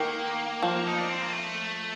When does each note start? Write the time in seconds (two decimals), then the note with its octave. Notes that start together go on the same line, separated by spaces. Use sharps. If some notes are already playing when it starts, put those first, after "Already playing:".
Already playing: D#3 A#3
0.63 F3
0.87 D#4
0.98 D4
1.09 C4
1.22 A#3
1.32 A3